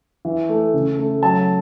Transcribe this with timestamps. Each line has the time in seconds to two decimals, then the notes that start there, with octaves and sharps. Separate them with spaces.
0.25 E3
0.49 A3
0.74 C#3
0.99 A3
1.22 F#3 A5